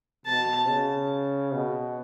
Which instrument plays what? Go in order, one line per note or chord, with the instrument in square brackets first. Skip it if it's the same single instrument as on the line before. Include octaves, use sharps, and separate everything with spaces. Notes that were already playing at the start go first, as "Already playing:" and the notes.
[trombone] B2 [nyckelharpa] A5
[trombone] C#3
B2